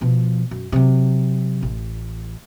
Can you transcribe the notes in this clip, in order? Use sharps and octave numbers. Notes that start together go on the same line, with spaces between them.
B2 F3
F#2
C3 F#3
A1